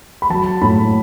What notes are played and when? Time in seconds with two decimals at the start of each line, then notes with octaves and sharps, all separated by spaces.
0.22 B5
0.30 F#3 A5
0.61 A2 B5